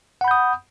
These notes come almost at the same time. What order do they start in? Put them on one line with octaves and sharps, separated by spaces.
F#5 B5 G6 D#6